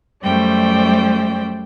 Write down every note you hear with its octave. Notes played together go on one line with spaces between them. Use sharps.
F#2 G3 A3 C5 D5 G5